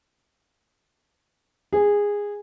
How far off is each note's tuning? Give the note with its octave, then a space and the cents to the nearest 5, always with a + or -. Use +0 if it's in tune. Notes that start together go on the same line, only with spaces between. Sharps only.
G#4 -15